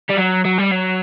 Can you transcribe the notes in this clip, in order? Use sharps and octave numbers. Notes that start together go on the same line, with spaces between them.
G3
F#3
F#3
G3
F#3